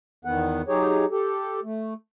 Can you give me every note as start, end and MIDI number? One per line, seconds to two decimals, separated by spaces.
0.25 0.62 40
0.25 0.62 51
0.25 0.62 59
0.25 0.62 78
0.68 1.05 54
0.68 1.05 63
0.68 1.05 67
0.68 1.05 68
0.68 1.05 73
1.11 1.60 67
1.11 1.60 69
1.63 1.94 57